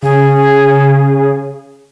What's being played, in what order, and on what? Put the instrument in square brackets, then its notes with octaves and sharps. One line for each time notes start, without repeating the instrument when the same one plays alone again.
[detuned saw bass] C#3 [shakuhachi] G#4